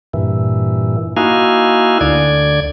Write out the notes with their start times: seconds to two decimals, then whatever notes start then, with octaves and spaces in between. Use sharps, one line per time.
0.14 G2 A#2 E3
1.17 A#3 D#4 E4 F#4 F5 G#5
2.01 D2 D3 D5 G#6